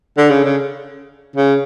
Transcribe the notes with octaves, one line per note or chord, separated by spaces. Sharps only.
D3
C#3
C#3
C#3